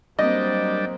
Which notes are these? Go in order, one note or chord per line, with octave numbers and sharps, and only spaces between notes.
F#3 G3 A#3 C4 D4 D#5